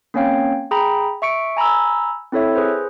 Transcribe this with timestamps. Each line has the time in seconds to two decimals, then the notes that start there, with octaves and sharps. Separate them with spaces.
0.14 A#3 C4 C#4 C#5 F5 G5
0.71 G#4 G5 A#5 B5
1.22 E5 C#6 C#7 D7
1.57 G#5 A#5 B5 E6
2.32 C4 E4 A4 C#5 E5
2.55 G#4 B4 C5